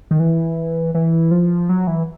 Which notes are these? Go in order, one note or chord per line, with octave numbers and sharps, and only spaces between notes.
D#3
E3
E3
F3
F#3
E3